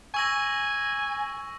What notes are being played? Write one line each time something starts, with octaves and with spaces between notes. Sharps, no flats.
G#5 C#6 E6 A#6